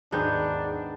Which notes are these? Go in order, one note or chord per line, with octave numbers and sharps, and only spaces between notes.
D#2 G#2 D#3 B3 D4 G#4 G6